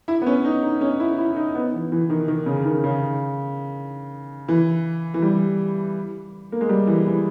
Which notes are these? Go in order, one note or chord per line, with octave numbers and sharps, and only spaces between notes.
E4
B3
C#4
D#4
D#4
C#4
E4
E4
D#4
B3
E3
E3
D#3
D#3
C#3
D#3
C#3
E3
E3
G3
A#3
G#3
G3
E3
E3